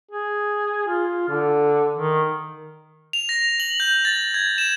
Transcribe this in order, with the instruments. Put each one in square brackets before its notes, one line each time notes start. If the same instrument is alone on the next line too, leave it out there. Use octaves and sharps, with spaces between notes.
[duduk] G#4
F4
D3
D#3
[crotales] F7
A#6
F#7
G6
A6
G#6
E7